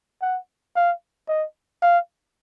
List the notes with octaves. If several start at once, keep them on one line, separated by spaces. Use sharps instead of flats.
F#5
F5
D#5
F5